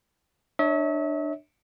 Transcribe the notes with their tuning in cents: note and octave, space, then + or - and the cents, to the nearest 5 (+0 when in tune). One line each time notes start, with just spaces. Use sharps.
D4 +20 C#5 +5 E5 -40